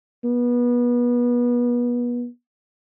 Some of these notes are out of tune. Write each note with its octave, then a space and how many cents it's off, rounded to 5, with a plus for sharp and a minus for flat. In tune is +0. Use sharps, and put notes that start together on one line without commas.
B3 -30